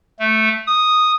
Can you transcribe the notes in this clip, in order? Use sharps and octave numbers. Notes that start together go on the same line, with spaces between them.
A3
D#6